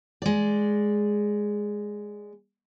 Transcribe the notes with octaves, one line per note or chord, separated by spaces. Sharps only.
G#3 D5